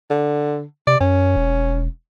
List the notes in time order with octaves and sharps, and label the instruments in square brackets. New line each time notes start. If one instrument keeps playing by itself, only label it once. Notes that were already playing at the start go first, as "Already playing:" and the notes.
[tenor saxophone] D3
[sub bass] C3 [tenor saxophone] D5
[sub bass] F#2 [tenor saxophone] C#4
[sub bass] E1